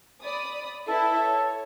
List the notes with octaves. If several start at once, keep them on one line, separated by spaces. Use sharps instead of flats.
D5 B5 D#6
E4 A4 B4 E5
C#5